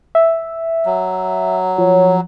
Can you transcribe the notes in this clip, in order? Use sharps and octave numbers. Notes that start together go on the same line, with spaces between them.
E5
F#3
F3 C#5